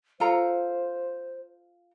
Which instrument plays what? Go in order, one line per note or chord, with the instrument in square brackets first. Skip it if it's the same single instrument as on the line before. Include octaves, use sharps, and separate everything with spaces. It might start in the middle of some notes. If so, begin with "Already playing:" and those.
[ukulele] F4 A4 A#5 [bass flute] C5